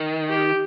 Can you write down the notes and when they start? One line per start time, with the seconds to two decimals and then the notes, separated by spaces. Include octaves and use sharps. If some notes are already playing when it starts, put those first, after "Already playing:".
Already playing: D#3
0.30 G4